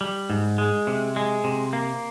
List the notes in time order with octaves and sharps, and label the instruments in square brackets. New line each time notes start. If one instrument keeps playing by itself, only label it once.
[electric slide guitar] G3
G#2
G#3
C3
G#3
C3
A#3